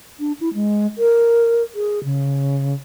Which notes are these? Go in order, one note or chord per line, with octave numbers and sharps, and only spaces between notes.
D4
E4
G#3
A#4
G#4
C#3